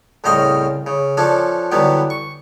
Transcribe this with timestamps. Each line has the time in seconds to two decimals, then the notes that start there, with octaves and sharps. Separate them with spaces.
0.24 C2 A2 C#3 C5 D#5 F5
0.87 C#3
1.17 F3 C#4 D4 A4
1.72 D3 E3 F#3 G3 B3
2.10 C#6